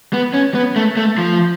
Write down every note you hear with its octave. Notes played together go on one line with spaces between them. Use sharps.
B3
C#4
B3
A3
A3
F3